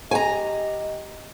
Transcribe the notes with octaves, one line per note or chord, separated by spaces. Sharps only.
G4 D#5 G#5 A#5